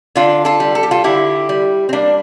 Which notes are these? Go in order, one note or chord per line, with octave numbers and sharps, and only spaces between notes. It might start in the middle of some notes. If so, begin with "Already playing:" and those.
D3 D4 F4
F4 A4
G3
A4
G4
F4 A4
D3 E4 G4
G3
C4
G3 A#3 D4